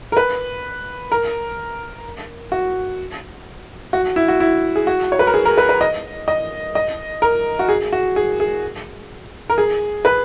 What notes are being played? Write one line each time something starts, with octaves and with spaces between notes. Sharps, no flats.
A#4
B4
A#4
F#4
F#4
E4
F#4
E4
G#4
F#4
C#5
B4
A#4
G#4
A#4
B4
B4
D#5
D#5
D#5
A#4
F#4
G#4
F#4
G#4
G#4
A#4
G#4
B4